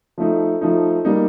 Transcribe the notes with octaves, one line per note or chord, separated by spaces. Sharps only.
F3 A3 D#4
F3 A3 D#4
G3 A#3 D#4